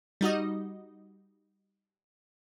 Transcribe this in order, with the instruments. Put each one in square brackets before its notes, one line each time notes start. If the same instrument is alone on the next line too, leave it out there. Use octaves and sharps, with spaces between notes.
[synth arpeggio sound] G3 D#4 F#4 D#5